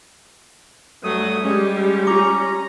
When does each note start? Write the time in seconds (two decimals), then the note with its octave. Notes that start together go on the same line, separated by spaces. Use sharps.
1.04 G2 F#3 A3 D#6
1.44 G3 G#3 C#4
2.07 G4 A#5 D6